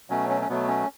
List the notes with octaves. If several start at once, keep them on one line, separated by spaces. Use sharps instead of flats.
B2 F#3 A3 C#4
C#4
C#4
B2 F#3 A3 B3
C#4